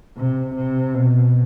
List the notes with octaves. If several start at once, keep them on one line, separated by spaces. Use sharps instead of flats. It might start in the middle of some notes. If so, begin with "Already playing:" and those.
C3
C3
B2